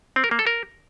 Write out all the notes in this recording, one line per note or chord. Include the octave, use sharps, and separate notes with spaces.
C4
A#4
A#3
A4
A#4